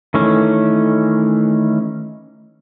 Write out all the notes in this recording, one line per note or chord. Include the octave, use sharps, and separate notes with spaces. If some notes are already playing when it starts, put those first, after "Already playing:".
D#3 E3 A3 C#4